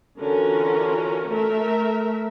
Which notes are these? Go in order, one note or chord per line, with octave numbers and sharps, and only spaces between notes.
D3 E3 C#4 F4 F#4 A#4
A3 A#4 E5